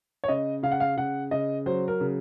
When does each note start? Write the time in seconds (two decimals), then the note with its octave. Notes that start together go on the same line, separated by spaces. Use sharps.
0.24 C#5
0.28 C#3 D#5
0.63 C#3 F5
0.72 F#5
0.80 F5
0.97 C#3 F#5
1.31 C#3 D#5
1.66 F#3 C5
1.88 A#4
2.00 C#3